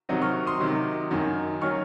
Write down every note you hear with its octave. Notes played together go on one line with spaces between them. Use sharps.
C3 D#3 F#3 C4 D#4 D#5 F#5
C#6 F6
C6 D#6
C3 D#3 F#3
F#2 D#3 F#3
D#3 F#3 C#4 C#6 F6